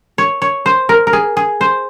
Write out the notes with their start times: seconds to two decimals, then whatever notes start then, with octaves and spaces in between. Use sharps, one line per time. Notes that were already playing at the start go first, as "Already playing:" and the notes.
0.18 C#5
0.42 C#5
0.66 C5
0.89 A#4
1.07 A#4
1.13 G#4
1.37 G#4
1.61 C5